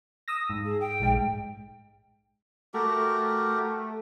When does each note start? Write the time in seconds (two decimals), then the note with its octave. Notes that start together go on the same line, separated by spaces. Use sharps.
0.28 D#6 E6 A#6
0.50 G#2
0.65 G#4
0.81 G5
1.00 A#1 G#2 G#3
2.74 A3 F#4 G4 A#4